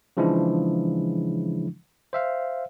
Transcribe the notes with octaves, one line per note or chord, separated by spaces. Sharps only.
C#3 E3 F3 G#3 D4 E4
C5 E5 F5